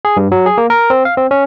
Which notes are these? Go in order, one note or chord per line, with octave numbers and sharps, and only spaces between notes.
G#4
G2
F#3
G#4
A#3
A#4
C4
F5
C4
C#4